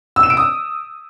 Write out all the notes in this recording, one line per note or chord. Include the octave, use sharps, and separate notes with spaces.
E6
E7
D7
D#6